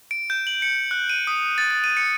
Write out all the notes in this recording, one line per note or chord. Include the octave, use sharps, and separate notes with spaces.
D7
G6
F#7
C#7
F#6
D#7
D#6
A6
A6
D#7
C#7